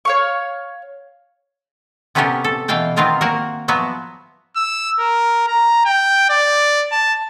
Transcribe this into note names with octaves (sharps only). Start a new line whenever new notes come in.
C#5 F5 C#6
C3 B3 C#4 G4 A4 A#4
A4
B2 E3 F5 G5 A5
D#3 B3 C4 F4 A#4 A#5
A#3 F#4 A#4
F3 F#3 B3 E5
E6
A#4
A#5
G5
D5
A5